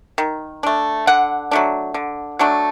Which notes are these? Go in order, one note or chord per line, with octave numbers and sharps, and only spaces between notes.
D#3
A3 D4
D3 F#5
F#3 A3 D4
D3
F#3 A3 D4